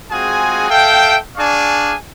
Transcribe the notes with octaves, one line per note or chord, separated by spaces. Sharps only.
G#3 C4 F4 F#4 G#4 G#5
A4 E5 F5 G5
D4 G#4 D5 F5 G#5 C#6